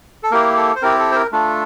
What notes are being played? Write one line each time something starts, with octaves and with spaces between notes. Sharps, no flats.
A4
A#3 E4 G4 A#4
A4
C5
C4 E4 G4 A#4
A4
C5
A#4
A3 D4 F4 A4